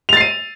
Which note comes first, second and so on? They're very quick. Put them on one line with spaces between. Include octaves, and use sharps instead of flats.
F7 A6 C7 D#7